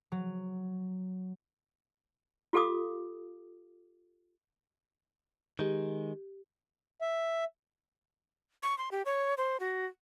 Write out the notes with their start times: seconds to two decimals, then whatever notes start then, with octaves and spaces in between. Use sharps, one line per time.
0.12 F#3
2.53 F4 G4 A4 F5 D6 D#6
5.59 D#3 G#3 G4
7.02 E5
8.63 C#6
8.78 C6
8.91 G4
9.05 C#5
9.38 C5
9.60 F#4